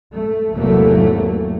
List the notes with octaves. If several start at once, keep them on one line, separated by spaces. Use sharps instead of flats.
A3
G#1 E2 C3 F#3 A3 A#3